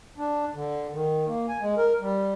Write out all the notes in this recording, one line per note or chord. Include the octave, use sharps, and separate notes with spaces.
D4
D3
D#3
A#3
G#5
G#3
A#4
G3